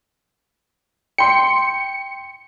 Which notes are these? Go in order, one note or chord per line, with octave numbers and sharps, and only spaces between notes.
G5 C6 C#7